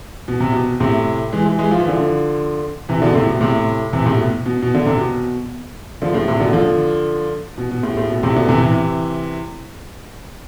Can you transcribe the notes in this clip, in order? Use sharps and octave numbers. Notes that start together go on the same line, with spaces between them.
B2
C3
B2
A2 C3
E3 G#3
E3 G#3
E3 G#3
F3
E3
D3 F3
C3 E3
B2 D3
A2 C3
B2
A2 C3
C3 E3
A2 C3
B2
B2
B2
D3
C3
B2
D3 F3
A2
A2 C3
B2 D3
D3 F3
B2
B2
A2
A2
B2
A2 C3
B2 D3
C3 E3
C3 E3